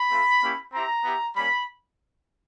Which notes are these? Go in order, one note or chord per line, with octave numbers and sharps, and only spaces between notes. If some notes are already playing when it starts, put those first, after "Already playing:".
Already playing: B5
A3 C4 F4
A#3 C#4 E4 G4
C4 E4 G4 A#5
B3 E4 G4
G3 A#3 C#4 B5